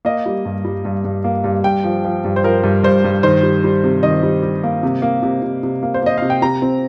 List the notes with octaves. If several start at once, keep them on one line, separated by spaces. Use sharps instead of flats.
A#3 D#5
G3
G2
G3
G2
G2
A#3
G2
G2 G5
F3
F3
G2
C5
F3 A#4
G2
G2 C5
G2
D#3 C5
G3
G3
C3
D#3 D#5
G3
G3
A#3
C3
A#3
C3
C3
C3
A#3
C5
A#3 D#5
C3 F5
G5
C3 A#5
C4